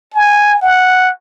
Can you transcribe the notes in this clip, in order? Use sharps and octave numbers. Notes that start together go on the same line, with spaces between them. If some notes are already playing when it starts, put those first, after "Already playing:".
G#5
F#5